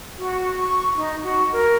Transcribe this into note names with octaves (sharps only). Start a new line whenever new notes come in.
F#4
C#6
D#4
F#4
A#4